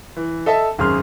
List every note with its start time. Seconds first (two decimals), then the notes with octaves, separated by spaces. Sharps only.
0.17 E3
0.46 A4 D#5 E5 A5
0.78 G#1 F#2 G#4 C6 F6